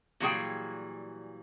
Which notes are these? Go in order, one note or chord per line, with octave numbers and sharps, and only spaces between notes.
A#2 E3 F#3 G3 G#4 G5